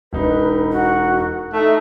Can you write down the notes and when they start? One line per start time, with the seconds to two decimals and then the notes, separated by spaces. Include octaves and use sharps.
0.13 E1 D#4 B4
0.72 F#4
1.53 A3 D#4